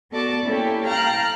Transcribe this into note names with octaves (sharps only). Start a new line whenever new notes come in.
B3 F#4 A4 D5 A5 D6
A#3 C#4 E4 G4 A4
F5 G5 A5 A#5 F6 F#6